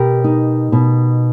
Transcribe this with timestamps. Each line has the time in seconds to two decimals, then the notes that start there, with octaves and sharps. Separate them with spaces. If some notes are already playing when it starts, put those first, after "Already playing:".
Already playing: B2 G4 A#4
0.24 D#4
0.72 B2